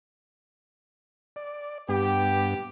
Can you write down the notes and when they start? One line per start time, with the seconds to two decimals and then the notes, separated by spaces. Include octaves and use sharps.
1.36 D5
1.88 G2 B3 G4